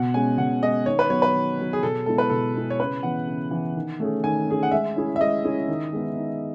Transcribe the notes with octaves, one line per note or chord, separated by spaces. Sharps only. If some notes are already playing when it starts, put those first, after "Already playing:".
Already playing: B2 F#5
G#3 C#4 G#5
B2 F#5
G#3 C#4 D#5
D#3 C#5
B4
F#3 B3 C#5
B4
D#3
F#3 B3
G#4
B2 A4
G#3 B3 E4 G#4 A4
B4
B2 A4
G#3 B3 E4 G#4
C#5
C#3 B4
E3 B3 F#5
C#3
E3 B3
D#3
A3 C#4 G#4
D#3 G#5
A3 C#4 G#4
F#5
G#3 E5
C#4 E4 G#4
E5
G#3 D#5
C#4 E4 G#4
D#3
G#3 B3 D#4
D#3